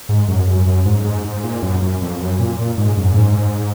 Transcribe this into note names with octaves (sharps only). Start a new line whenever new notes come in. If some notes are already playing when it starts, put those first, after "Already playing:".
G#2
F#2
F#2
F#2
G#2
G#2
G#2
A#2
F#2
F#2
F2
F#2
A#2
A#2
G#2
F#2
A#2
G#2